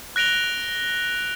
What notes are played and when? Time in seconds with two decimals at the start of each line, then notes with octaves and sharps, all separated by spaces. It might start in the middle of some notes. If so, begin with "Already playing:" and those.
0.16 F#6 A#6 D7 F7 G7